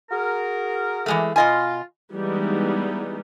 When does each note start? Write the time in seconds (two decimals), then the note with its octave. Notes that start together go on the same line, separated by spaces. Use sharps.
0.11 F#4 G#4 A#4
1.06 E3 G#3 A3
1.36 B2 F4 D#5 G#5
2.12 E3 G3 G#3 B3 D#4